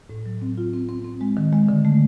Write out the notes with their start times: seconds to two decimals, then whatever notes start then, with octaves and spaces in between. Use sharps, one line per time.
0.10 A2
0.26 F#3
0.42 C4
0.58 F4
0.73 C4
0.89 C4
1.04 C4
1.21 G#3
1.37 D#3
1.53 G#3
1.69 D3
1.85 A3